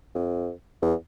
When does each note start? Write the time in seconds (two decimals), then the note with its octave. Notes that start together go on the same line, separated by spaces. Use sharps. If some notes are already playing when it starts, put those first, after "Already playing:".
0.15 F2
0.82 E2